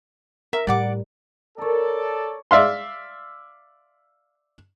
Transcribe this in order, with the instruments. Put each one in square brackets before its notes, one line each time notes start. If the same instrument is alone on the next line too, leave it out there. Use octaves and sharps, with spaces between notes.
[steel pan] A#4 [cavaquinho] E5
[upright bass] A2 [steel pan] G3 [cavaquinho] D5 F#5 D6
[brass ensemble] A4 D5 [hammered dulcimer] A#4 C#5
[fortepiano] D5 E5 F5 C6